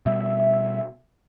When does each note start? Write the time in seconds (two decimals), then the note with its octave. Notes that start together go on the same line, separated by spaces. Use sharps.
0.06 B2 G3 E5